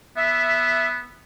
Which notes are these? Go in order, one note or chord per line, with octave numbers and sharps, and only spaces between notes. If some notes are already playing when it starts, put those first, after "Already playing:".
B3 E5